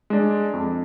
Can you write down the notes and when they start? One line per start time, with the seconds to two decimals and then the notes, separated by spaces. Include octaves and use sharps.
0.10 G#3 D4
0.53 F2